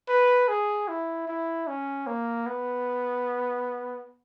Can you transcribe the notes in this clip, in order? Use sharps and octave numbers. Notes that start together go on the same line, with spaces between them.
B4
G#4
E4
E4
C#4
A#3
B3